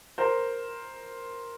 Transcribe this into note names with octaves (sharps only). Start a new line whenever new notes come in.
A#4 C5